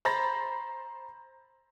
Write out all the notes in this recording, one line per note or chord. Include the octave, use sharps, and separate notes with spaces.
C5 A#5 B5 A6 A#6